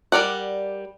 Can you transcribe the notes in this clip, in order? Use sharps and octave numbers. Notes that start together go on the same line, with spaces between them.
G3 A#4 D5 F#5